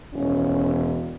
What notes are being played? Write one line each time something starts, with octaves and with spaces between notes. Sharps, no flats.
E1 C#4